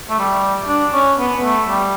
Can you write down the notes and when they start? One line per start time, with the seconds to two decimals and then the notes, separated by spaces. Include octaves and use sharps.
0.09 A3
0.19 G3
0.68 D4
0.93 C#4
1.19 B3
1.43 A3
1.69 G3